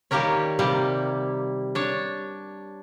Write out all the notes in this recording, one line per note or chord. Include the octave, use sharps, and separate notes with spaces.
D#3 G3 A#3 G4 A#4 C#5
C3 G3 A#3
D4 C#5